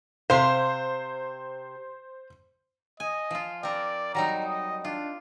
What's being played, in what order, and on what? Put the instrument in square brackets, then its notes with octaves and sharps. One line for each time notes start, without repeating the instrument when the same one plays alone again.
[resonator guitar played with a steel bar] C3 F5 [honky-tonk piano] C5 C6
[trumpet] D#5 [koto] G#5
[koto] F3 F4
[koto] C4 A#4 [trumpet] D5
[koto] F#3 G3 D#4 [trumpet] A#5
[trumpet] D#5
[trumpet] D4 [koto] F4